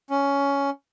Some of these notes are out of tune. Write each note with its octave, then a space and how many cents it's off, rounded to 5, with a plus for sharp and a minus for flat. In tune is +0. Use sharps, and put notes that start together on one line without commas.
C#4 +10